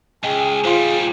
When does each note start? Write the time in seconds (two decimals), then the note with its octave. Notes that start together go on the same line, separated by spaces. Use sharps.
0.24 C#2 G#4 D#5 G5
0.64 A#2 G3 F4 C5 F5 C6